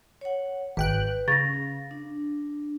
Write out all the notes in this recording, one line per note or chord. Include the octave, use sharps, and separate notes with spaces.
C#5 F#5
G#1 B4 G5 F#6
C#3 F5 A6 A#6
D4